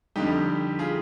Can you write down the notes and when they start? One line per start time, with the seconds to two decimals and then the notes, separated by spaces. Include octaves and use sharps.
0.16 F2 D3 G3 D#4 G4
0.79 F4 G#4